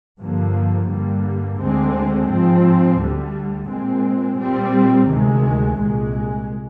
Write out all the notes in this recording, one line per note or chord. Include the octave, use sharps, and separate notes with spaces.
G2 D3 F3 A#3
G2 D3 G3 A#3
D2 D3 G#3 C4
G#2 F3 C4
D2 D3 G3
A#2 G#3 C4
A#2 G3 C4
D2 C3 D#3 G#3
C2 A#2 G#3